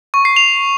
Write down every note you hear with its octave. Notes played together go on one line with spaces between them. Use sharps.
C#6
C7
F7